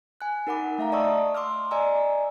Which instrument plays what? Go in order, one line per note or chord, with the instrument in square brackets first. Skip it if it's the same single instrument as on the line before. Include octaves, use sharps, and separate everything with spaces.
[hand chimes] G#5 F#6
D#4 A#4 F#5 B5 D6
A3 E5 F5 A#5
D5 D#5 A5 C#6 D#6 E6
C6 D6 E6 F6
D5 D#5 G#5 A#5 E6